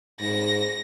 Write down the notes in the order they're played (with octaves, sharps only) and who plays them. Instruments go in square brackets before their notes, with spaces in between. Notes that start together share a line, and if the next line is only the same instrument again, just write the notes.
[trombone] G#2 [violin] A#6